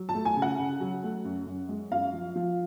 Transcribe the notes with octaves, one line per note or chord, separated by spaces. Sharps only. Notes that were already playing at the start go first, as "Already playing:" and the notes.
Already playing: F#3
A5
A3
G#5
C#3
F#5
C#3
F#3
A3
F#2
F#2
G#3
F#2 F5
F3
F3